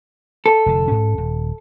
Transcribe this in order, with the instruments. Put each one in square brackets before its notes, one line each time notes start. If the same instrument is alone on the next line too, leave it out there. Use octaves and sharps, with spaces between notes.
[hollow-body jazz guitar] A4
[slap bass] F1 D3
G#2 C#4
D#1